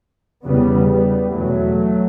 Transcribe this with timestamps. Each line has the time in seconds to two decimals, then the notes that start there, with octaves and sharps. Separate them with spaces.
0.44 E2 C#3 G3 B3
0.88 G3 B3
1.32 E2 B2 F#3 A3